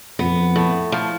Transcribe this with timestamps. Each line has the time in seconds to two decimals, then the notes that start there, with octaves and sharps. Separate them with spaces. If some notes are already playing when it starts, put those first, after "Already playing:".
0.19 F2 B3
0.56 A2
0.92 F3